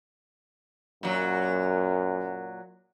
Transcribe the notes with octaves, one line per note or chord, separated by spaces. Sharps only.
F#2 A#2 F#3